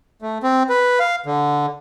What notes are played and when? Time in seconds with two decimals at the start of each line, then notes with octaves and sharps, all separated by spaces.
0.22 A3
0.43 C4
0.69 B4
1.00 F5
1.26 D3